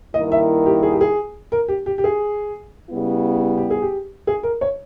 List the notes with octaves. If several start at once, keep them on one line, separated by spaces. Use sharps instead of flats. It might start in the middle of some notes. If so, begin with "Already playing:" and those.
G2 D#3 A#3 E4 D#5
E5
G4
G#4
G4
G#4
A#4
G4
G4
G4
G#4
C#3 G3 B3 E4
G4
G#4
G4
G#4
A#4
C#5